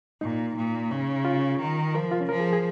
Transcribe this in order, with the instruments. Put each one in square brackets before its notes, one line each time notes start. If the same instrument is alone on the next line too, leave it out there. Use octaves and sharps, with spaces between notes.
[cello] A#2 [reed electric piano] D#4
[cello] A#2
C#3
[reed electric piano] F4
[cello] D#3
[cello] F3 [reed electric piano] A#4
[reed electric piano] F4
C#4
[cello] F3 [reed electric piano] A#4
[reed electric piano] G#4
G#4